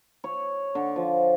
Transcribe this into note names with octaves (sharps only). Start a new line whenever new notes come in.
C#5
D3
F3